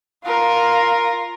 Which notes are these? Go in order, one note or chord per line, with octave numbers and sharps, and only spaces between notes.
F4 A#4